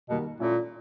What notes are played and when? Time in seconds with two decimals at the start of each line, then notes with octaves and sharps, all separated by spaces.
0.09 B2 D#3 G3 A#3
0.39 A#2 A3 C#4 E4 A4